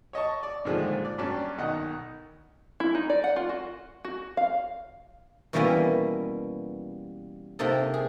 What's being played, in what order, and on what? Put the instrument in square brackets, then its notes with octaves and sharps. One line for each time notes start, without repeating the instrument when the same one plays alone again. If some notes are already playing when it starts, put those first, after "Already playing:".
[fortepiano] C#5 D#5 A5 C#6
D5
G2 A#2 D3 D#3 F3 G#3
D5
G2 F#3 C#4 D5 A5 C#6
B1 D#3 D#5 F#5
[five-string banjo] E4
D#4
D5
F#5
F4
F#4
F#4
F5
[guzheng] B2 E3 G3 A#3 B3 C#4
C3 A#3 C4 D#4 A4
G#4